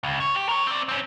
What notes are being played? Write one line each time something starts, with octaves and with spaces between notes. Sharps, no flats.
C#2
C#5
G4
A#4 C#5
C4 D5
C4 C#4